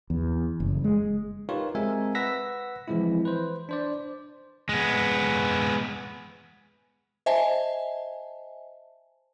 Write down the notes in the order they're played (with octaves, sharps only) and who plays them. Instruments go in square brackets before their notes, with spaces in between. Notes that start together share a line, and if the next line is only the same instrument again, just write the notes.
[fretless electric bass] E2
F#1
G#3
[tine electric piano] D#4 F4 G4 A#4 B4 C#5
G#3 C4 F4 A#4 E5 G#5
B4 F#5 E6 A#6 B6
E3 F3 G#3 C4 E4
B4 C5
D4 C5 D5
[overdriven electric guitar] G#3 B3
[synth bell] C5 D#5 E5 G#5 A5